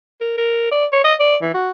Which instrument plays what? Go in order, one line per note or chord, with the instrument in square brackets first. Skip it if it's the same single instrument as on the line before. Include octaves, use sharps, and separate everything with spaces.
[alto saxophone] A#4
A#4
D5
C#5
D#5
D5
E3
F#4